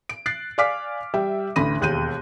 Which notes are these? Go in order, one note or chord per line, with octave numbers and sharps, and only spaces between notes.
D7
F#6 A6 C7
D5 F5 G#5 D6 F6 B6
G3 E5 G5
A1 D2 D3 B5 A#6 D#7
E1 D#2 F#6 G6 D#7